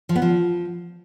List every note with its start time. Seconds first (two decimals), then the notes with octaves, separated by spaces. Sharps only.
0.09 F3
0.16 B3
0.22 F3